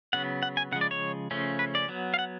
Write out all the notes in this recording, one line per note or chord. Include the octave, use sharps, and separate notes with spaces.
C#3 F#3 B3 F#5
F#5
G#5
C#3 F3 G#3 F#5
D5
C#5
C#3 F3 A3 C#4
B4
D5
F#3 B3
F5
F#5